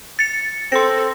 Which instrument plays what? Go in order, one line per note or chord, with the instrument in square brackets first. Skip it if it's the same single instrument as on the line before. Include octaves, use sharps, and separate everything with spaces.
[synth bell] A6 C#7
[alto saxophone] C4 [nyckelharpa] A4 [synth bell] C6 A#6